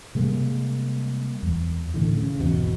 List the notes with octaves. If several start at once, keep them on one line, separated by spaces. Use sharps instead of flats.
C3 G3 G#3 A#3
E2
A2 D3 E3
C#3
G#1 E2 B2